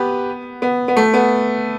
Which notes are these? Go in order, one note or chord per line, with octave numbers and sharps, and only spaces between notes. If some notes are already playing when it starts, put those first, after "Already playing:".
Already playing: B3 G4 B4
B3
B3
A3
B3